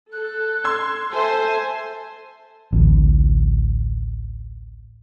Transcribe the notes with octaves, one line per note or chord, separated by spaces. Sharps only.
A4 F#6
C6 E6 G#6
A4 C5 E5 G#5
A1 D2